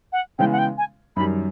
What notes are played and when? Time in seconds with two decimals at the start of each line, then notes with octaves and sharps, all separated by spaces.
0.12 F#5
0.38 C#3 E3 G#3 B3 G5
0.52 F#5
0.58 G5
0.77 G#5
1.16 F#2 D#3 G3 B5